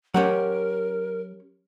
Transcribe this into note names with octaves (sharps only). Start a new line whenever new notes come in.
F#3 C#4 G4 A#4 F#5